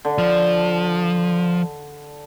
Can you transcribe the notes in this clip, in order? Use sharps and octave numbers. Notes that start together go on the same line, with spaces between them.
D3
F3